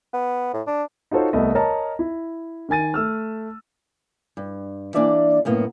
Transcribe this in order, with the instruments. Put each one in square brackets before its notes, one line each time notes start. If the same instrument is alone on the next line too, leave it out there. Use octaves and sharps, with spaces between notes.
[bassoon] B3
A2
D4
[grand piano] D#4 F4 F#4 A4 C5 C#5
C2 A3 B3 D#5
A#4 C#5 D#5 A5 A#5
E4
D#3 A#4 G#5 A6 D#7
A3 E6 F6
[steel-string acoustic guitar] G2
E3 A#3 D4 D5 E5
F#2 A2 A#3 B3